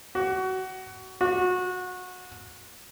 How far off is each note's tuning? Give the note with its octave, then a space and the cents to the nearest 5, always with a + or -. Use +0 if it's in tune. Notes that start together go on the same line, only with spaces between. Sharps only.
F#4 +20
F#4 -25